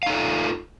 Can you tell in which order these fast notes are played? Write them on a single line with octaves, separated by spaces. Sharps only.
F5 D#4 A4 F4